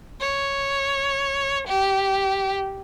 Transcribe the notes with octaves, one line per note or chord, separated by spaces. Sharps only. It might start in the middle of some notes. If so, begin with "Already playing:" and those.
C#5
G4